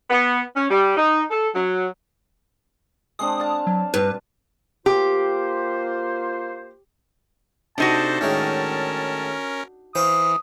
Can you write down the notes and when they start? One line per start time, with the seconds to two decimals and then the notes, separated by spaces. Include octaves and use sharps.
0.10 B3
0.55 C#4
0.69 G3
0.97 D#4
1.30 A4
1.55 F#3
3.19 G#3 C4 D4 D#6
3.40 D5 F5 A5
3.67 F#3
3.94 G2 B4
4.86 A#3 F4 G4 C5
7.78 C3 D4 D#4 F#4 A4 C5 A5
8.21 A2 D#3 G#3 C#4 A#4
9.95 E3 C5 F5 C#6 D#6